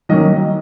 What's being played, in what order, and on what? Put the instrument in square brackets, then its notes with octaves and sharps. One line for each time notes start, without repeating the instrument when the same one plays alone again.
[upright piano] D#3 F#3 A#3 C#4 D#5